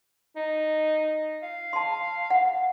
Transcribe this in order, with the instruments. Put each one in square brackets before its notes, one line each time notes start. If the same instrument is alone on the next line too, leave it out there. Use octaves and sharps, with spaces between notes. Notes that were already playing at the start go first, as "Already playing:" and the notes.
[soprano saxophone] D#4
F5
[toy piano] A5 C6
F#5